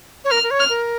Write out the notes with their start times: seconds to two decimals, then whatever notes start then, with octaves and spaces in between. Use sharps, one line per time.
0.25 C#5
0.30 A#4 F6
0.43 A#4
0.51 C#5
0.59 F6
0.69 A#4